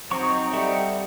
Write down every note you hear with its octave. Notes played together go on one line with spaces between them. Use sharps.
F#3 C4 D#4 C#6
G3 A4 E5 F#5